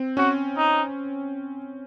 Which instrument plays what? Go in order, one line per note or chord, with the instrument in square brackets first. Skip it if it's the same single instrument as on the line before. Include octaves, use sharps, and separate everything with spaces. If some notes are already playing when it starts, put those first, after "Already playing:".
Already playing: [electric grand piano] C4
[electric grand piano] C#4 [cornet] F#4
[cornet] D#4